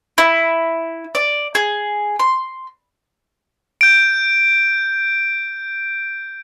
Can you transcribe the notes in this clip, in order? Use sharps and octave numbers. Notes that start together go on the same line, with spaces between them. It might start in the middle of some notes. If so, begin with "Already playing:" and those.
E4
D5
G#4
C6
G6 D7